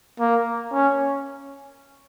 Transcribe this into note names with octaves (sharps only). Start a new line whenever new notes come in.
A#3
C#4